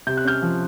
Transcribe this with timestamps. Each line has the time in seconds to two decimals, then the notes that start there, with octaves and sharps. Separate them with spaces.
0.07 C3 G6
0.17 F#6
0.25 C#4 F6 G6
0.42 F3